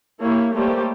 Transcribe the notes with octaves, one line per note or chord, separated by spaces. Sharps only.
A#3 E4 G4 C#5
G3 A3 A#3 G4 C5 C#5